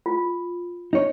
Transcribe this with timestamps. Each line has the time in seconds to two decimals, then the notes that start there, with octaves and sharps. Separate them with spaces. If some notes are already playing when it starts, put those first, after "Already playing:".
0.06 F4
0.93 D#4 C#5